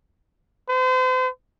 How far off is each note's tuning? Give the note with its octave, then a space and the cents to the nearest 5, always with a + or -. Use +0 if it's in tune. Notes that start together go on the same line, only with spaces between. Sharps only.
C5 -40